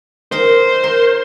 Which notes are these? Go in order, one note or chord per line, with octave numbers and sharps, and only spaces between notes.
D#4 A#4 C5
A#4